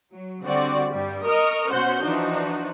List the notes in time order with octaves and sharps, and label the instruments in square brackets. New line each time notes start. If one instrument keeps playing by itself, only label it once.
[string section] F#3
D3 G3 C4 F#4 D5
G2 G3
A#4 D#5 C#6 D#6 F6
B2 C#4 F#4 C5 F#5 G6
E3 F3 D4 D#4 F#4